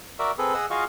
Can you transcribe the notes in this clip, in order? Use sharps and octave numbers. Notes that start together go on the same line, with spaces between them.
F#4 A#4 D5 E5
C4 G#4 A4 B4
G#4 D#5 F#5 E6
F4 F#4 G#4 D#5 F5 C#6